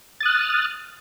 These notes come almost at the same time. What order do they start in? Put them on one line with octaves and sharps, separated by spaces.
A6 D#6 F#6 F6